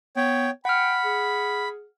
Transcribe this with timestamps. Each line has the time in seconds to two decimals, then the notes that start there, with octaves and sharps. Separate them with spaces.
0.16 B3 C#5 G5
0.65 F#5 G5 B5 F6
1.04 G#4